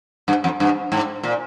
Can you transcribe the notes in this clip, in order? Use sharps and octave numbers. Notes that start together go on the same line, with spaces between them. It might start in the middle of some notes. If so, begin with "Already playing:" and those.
G2
F2
G2
G#2
A#2